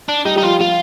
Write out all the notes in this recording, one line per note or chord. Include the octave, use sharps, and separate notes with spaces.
D4
G3 D#4
G3 D#4
F3 F4
G3 F4